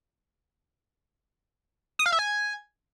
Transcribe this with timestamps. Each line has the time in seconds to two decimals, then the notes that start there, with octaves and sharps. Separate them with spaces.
1.99 D#6
2.06 F5
2.12 E5
2.19 G#5